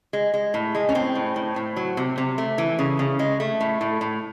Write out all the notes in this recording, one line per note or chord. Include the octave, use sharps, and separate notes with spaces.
G#3
G#3
A2
G#3
C#4
A2 C4
A2
A2
A2
F#3
C3
C3
A3
E3
C#3
C#3
G#3
A3
A2
A2
A2